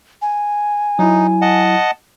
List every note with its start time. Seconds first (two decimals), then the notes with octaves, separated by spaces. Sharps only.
0.22 G#5
0.99 F#3 D#4 E4
1.42 D#5 F#5 A5